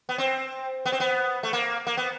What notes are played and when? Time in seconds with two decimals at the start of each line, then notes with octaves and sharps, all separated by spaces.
0.09 B3
0.18 C4
0.86 B3
0.92 C4
1.00 B3
1.43 A3
1.53 A#3
1.87 A#3
1.97 B3